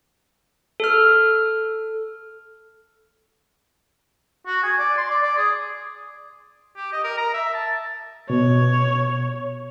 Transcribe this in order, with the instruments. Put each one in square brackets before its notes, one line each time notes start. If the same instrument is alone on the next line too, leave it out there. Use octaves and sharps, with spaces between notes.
[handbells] A4 F6
[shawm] F#4
G#5
D5
C6
D5
D5
G#4
[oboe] G4
D#5
A#4
A#5
E5
A5
[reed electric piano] B2 [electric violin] C#5